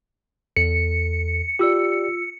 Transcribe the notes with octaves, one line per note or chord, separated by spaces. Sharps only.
E2 A4 C#7
F4 G4 D5 E6